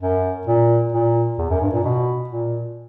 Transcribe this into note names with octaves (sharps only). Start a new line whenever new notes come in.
F#2
A#2
A#2
E2
F#2
G2
A#2
B2
A#2